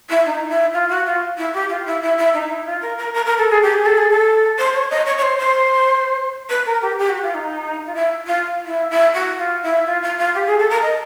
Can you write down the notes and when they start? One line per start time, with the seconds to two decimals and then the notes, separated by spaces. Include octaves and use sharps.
0.09 E4
0.26 D#4
0.49 E4
0.74 F4
0.89 F#4
1.06 F4
1.38 E4
1.54 G4
1.70 F4
1.86 E4
2.02 E4
2.18 E4
2.33 D#4
2.50 E4
2.65 F4
2.82 A#4
2.98 A#4
3.14 A#4
3.26 A#4
3.38 A4
3.50 G#4
3.62 G4
3.74 G#4
3.86 A4
3.98 G#4
4.10 A4
4.58 C5
4.74 C#5
4.90 D#5
5.06 C#5
5.17 C#5
5.22 C5
5.38 C5
6.50 B4
6.66 A#4
6.82 G4
6.98 G4
7.10 F#4
7.22 F4
7.34 D#4
7.86 F4
7.95 E4
8.26 F4
8.66 E4
8.90 E4
9.14 F#4
9.39 F4
9.63 E4
9.86 F4
10.03 F4
10.18 F4
10.34 G4
10.47 G#4
10.59 A4
10.70 A#4
10.82 D#5